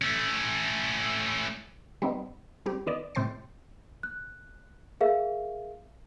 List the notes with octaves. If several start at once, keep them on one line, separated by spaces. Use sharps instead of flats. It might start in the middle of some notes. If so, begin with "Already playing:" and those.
A3 C#4
G3 B3 C4 D#4
G3 C4 G4
D#3 B3 D5 D#5
A2 C3 C5 G5 A6 C7
F#6
G#4 A#4 E5 F5